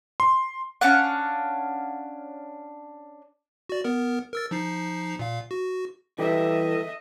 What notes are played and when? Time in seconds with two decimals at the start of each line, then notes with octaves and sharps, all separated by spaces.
0.20 C6
0.81 C#4 D4 F5 F#5
3.69 F#4 D5
3.84 B3 A#4
4.33 A#4 E6 A6
4.51 F3 D#4 C7
5.19 A#2 F5
5.51 F#4
6.19 E3 G3 G4 A4 D#5 E5